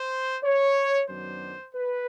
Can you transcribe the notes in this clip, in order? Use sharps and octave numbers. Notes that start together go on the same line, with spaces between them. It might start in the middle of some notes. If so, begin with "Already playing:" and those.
Already playing: C5
C#5
F#2 D#3 F#3 B3 D4 C5
B4